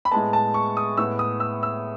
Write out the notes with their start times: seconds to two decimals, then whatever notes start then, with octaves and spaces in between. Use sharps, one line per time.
0.05 B5
0.11 A2 G#3 B3 A5
0.33 A5
0.54 C#6
0.77 D#6
0.97 A2 G#3 B3 E6
1.19 D#6
1.40 E6
1.63 E6